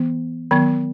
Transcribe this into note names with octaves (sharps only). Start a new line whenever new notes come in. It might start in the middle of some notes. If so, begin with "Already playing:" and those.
Already playing: E3 B3
D#3 F#3 B3